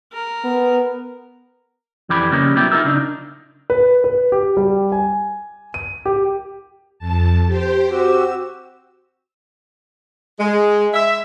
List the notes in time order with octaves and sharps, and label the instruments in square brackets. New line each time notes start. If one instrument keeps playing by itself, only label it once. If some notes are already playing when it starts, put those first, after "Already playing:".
[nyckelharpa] A#4
[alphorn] B3
[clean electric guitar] F2 E3 G4 D5 B5
C#3 G3 A#3 B3 C#4 D#4
B1 B2 E4 G4
D#4 F4 A#4 E5
C#3 D4 D#4
[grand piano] B4
B4
G4
G3
G#5
D#7
G4
[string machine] F2 A5
G4 C5
[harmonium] C4 F#4 G4 [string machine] E6
[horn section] G#3
E5